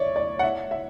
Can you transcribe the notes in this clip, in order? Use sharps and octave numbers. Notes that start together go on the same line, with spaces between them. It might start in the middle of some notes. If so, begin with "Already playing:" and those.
Already playing: C#5 D5 E5
D5
F#5
E5
E5